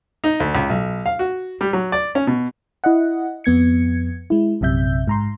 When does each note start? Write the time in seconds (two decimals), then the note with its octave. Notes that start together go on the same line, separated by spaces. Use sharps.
0.24 D#4
0.40 D2
0.55 C#2
0.70 B1
1.06 F5
1.19 F#4
1.61 G3
1.73 F#3
1.92 D5
2.15 C#4
2.27 B2
2.84 E4 D#5 F#5
3.44 F2 B3 G#6 C#7
4.30 G#3 E4
4.61 A#1 F#2 C3 E5 G6
5.08 G#2 A#5 C6